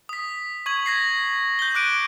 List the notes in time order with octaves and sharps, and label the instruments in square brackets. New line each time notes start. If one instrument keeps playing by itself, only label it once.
[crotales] D#6 B6
C#6 G#6 F#7
G#6 A#6 C7
G6 G7
D6 F#6 D7 D#7